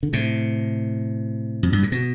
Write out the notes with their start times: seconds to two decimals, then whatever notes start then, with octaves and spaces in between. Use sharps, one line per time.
0.03 D3
0.13 A2 C3
1.63 F2
1.73 G2
1.83 A2
1.92 B2